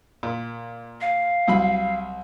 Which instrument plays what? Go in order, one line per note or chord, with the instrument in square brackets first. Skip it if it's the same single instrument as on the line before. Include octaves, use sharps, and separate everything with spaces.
[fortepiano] A#2
[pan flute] F5
[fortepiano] C2 F#3 B5